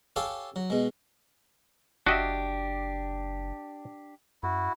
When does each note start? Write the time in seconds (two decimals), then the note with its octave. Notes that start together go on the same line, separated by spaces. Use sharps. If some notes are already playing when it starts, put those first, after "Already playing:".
0.16 G4 A4 C#5 F5 G5 G#5
0.56 F#3
0.70 B2 G#3
2.07 F#1 D4 F#4 G4 D#5 E5
4.43 F#2 E4 F#4